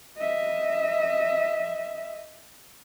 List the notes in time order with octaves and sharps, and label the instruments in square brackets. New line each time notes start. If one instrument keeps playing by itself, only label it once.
[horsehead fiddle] D#5 E5